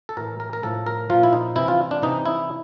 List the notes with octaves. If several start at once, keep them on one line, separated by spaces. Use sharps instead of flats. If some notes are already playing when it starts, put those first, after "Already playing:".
A4
A2 E3 A#4
A#4
A#4
A2 F3 A4
A#4
A#2 F3 F4
E4
D#4
C3 E3 E4
F4
D4
C3 E3 D#4
E4